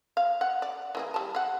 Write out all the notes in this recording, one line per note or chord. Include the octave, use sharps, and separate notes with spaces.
F5
F#5
D5
E3 A#3 G#4
G3 A5
F5 F#5